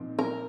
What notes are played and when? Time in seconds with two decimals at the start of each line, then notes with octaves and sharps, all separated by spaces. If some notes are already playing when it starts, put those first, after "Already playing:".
Already playing: A#2 F3 C4 D#4
0.19 A#4